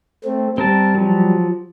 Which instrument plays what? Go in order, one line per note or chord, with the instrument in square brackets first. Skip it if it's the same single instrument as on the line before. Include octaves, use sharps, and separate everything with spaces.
[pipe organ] A3 C4
[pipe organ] G3 [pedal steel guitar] C4 A#4 A5
[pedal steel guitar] F3 F#3